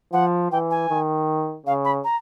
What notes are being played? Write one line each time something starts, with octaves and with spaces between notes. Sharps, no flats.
F3 F#5
E3 G5
G#5
D#3
C#3 F5
B5
A#5